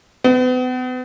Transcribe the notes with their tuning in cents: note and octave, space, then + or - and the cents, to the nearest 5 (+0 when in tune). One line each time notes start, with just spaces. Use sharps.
B3 +40